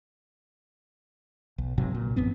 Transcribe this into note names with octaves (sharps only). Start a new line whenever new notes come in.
B1
B1 G#2 C3 F#3
A#2
A1 F#2 B3 C4